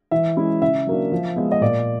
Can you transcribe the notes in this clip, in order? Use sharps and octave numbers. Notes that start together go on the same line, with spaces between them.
E3 E5
G#3 C#4 E4
C#3 E5
F#3 A#3 D4
F3
G#3 B3
D#5
A#2 D5